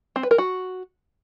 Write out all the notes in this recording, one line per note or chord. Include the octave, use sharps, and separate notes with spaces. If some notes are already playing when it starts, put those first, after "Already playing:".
C4
B4
A#4
F#4